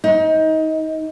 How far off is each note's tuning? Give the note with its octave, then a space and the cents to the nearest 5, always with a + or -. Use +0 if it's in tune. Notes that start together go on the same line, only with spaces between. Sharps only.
D#4 +25